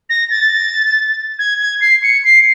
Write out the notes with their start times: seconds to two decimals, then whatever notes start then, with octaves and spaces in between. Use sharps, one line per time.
0.09 A#6
0.30 A6
1.39 G#6
1.60 G#6
1.81 C7
2.03 C#7
2.24 C7